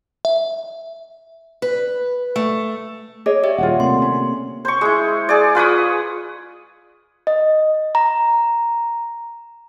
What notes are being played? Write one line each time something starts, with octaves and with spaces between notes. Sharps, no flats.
E5
B4
A3
G#4 C#5 D#5 D6
G4 D5 E5
D#1 F4 C#5 F#5
C3 A3 A#3 C6
C#4
C5 C#6
G#3 E4
G#4 D5
F4 B4 C#6 D#6
D#5
A#5